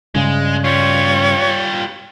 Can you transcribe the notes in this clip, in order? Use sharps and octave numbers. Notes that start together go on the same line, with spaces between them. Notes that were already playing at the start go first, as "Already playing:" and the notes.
G2 C#3 G#3
G3 F4 C#5